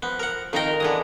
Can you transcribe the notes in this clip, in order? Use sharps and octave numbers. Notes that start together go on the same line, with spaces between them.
F3 B3
A#4 F#5
F2 D#3 D#4 A#4 G5
D3 E3 G#3 B3 D#6